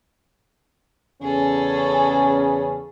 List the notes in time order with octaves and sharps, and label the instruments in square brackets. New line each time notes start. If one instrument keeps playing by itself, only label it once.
[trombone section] E2 C#3 C#4 [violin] G#4 A4